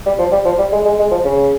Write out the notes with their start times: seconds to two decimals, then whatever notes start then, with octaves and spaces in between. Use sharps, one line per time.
0.06 G3
0.19 F3
0.32 G3
0.45 F3
0.58 G3
0.72 G#3
0.85 G#3
0.99 G#3
1.11 F3
1.25 C#3